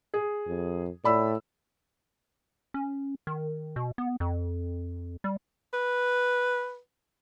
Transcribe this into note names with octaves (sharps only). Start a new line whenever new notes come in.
G#4
F2
A2 D5 B5 E6
C#4
D#3
B2
B3
F2
G3
B4